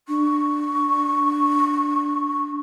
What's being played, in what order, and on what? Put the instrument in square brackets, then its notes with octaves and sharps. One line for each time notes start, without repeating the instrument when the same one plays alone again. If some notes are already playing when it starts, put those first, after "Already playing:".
[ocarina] D4 [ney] C#6